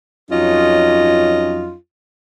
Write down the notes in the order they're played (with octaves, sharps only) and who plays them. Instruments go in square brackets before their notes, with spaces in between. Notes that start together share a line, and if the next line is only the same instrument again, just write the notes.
[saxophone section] F2 F#3 C#4 D#4 F4 D#5